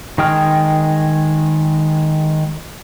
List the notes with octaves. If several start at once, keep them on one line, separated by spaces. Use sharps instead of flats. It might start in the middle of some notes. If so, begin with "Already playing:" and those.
D#3 G#3 G#4 G5 F6